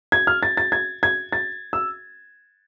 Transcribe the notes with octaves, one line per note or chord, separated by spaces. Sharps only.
G#6
F6
A6
A6
G#6
G#6
A6
E6